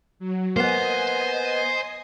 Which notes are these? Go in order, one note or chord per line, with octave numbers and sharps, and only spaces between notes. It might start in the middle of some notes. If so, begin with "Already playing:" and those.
F#3
A#3 B3 C5 D#5 G#5 D#6